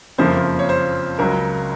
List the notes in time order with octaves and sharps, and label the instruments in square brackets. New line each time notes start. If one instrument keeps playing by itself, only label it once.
[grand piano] F#1 F2 C#3 F3 A#3 [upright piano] C5
[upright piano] C#5
C5
[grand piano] C#2 C#3 F#3 [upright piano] A#4